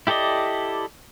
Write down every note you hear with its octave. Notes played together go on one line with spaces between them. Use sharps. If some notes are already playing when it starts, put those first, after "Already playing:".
E4 G4 A4 D5 D#5